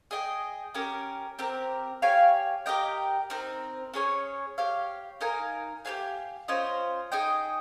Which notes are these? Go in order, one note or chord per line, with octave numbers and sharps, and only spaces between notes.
G#4 D#5 G5
C#4 G4 A#4
C4 G4 A#4
G4 C#5 F5 G#5
G4 A#4 D#5 G5
C4 D#4 A#4
C#4 G#4 C#5
G4 C#5 F5
D#4 A#4 F5 G#5
G4 C#5 F5 G#5
C#4 F4 C5 D#5
D#4 G#4 D#5 G5